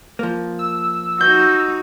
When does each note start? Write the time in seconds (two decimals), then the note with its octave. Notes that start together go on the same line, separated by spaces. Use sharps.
0.19 F3 A#3
0.59 E6
1.21 D#4 F#4 G6